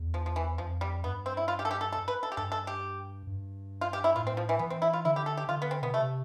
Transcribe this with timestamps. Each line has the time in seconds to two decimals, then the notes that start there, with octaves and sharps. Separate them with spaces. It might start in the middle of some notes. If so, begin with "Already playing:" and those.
Already playing: E2
0.14 F3
0.26 F3
0.36 E3
0.58 F2 F3
0.81 G3
1.03 G2 B3
1.26 C4
1.37 E4
1.48 F4
1.59 G4
1.65 A4
1.71 G4
1.81 A4
1.93 A4
2.08 B4
2.23 A4
2.32 G4
2.37 G2 A4
2.52 A4
2.67 G4
3.27 G2
3.81 F4
3.93 G4
4.04 E4
4.16 A2 F4
4.27 C4
4.37 F3
4.49 E3
4.59 E3 B3
4.70 C4
4.82 E4
4.93 F4
5.05 D3 E4
5.16 G4
5.26 A4
5.37 G4
5.49 D3 F4
5.62 B3
5.71 C4
5.82 B2 B3
5.93 C3 A3